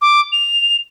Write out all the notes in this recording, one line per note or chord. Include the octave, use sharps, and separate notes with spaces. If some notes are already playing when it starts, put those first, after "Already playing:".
D6
F7